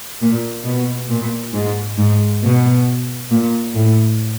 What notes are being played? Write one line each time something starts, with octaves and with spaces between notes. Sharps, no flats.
A#2
B2
A#2
G#2
G#2
B2
A#2
A2